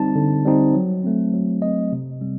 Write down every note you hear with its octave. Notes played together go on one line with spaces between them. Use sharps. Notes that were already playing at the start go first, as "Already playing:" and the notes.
Already playing: D3 G3 C4 D#4 A5
D3
G3 C4 D#4
F#3
A3 C4
F#3
A3 C4 D#5
C3
G3 C4